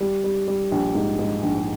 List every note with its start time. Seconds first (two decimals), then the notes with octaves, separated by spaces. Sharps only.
0.01 G3
0.24 G3
0.48 G3
0.72 A#1
0.95 G#2
1.19 G#2
1.43 A#1